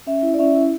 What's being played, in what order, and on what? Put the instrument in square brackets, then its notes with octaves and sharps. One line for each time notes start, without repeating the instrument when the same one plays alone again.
[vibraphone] C#4 E5
E4
D5
C#4 E5
E4